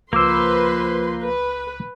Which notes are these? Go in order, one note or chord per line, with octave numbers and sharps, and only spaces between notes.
C#2 F3 A#3 B4 C5 C6 D6 E6
B4